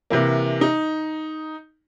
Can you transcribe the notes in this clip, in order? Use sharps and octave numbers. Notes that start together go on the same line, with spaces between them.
C3 E3 A#3
D#4